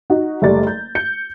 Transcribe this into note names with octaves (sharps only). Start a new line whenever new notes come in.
D#4 F#4
F#1 G3 A3 D5 A6
G6
G6 C#7